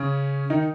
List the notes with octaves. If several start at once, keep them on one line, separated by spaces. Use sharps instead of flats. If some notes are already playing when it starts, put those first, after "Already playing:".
Already playing: C#3 C#4
D#3 D#4